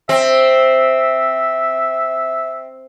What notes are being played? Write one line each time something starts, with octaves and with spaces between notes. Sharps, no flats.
C4 E5